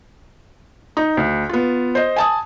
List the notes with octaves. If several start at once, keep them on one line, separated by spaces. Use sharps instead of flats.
D#4
D2
B3 F4
C5 D#5
G#5 A5 D#6